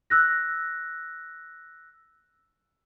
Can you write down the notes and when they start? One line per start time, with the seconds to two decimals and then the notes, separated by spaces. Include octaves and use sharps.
0.10 E6 F#6 A#6